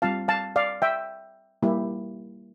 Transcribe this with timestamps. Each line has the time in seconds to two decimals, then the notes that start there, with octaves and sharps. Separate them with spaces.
0.02 G3 C4 F4 F5 A5
0.28 F5 A5
0.56 D5 F5
0.82 E5 G5
1.62 G3 A#3 E4 G4